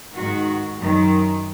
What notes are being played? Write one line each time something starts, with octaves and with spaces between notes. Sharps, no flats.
G#2 D#3 F#4
F#2 D#3